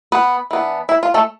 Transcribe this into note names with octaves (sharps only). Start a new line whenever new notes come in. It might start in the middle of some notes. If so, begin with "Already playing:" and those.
B3 B4
E3 B3 D4
E4
F4
A3 A4